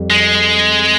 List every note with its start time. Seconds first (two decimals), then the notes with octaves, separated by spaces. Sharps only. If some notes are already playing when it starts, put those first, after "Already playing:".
Already playing: F2 G3
0.11 G#3